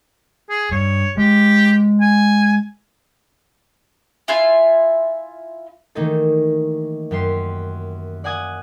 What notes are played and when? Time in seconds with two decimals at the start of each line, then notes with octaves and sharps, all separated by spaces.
0.49 G#4
0.71 G2 C#5
1.17 G#3 G4
2.01 G#5
4.28 E4 F4 E5 G#5
5.95 D#3 E3 A3 A#3 D#4 A4
7.11 F#2 G4 C6
8.24 D5 F#5 G#5 D#6 G#6